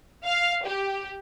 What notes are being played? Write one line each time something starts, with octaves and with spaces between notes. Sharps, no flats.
F5
G4